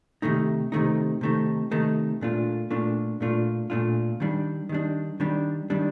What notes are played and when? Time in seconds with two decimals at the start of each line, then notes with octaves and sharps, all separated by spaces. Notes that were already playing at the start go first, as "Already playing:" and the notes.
0.22 C3 D#3 A3 D#4
0.72 C3 D#3 A3 D#4
1.21 C3 D#3 A3 D#4
1.71 C3 D#3 A3 D#4
2.21 A#2 A3 D4 F4
2.70 A#2 A3 D4 F4
3.21 A#2 A3 D4 F4
3.70 A#2 A3 D4 F4
4.20 D#3 G3 D4
4.69 D#3 G3 D4
5.20 D#3 G3 D4
5.70 D#3 G3 D4